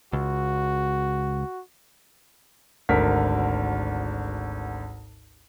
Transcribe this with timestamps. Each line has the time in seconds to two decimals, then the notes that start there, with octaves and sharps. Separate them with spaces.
0.13 C#2 F#4
2.89 G#1 D2 A#4 B6